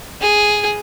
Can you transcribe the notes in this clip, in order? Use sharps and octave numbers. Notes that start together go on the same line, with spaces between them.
G#4